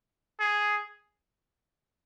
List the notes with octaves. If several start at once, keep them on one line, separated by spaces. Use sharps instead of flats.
G#4